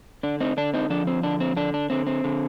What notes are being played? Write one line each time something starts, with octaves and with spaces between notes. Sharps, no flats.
D3 D4
C4 D#4
D3 D4
C4 D#4
F3 D4
C4
D3 D4
C4
D3 D4
D4
D3 C4
C4
D3